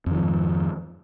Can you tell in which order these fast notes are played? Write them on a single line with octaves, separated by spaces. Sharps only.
F2 D#3 F3 G#2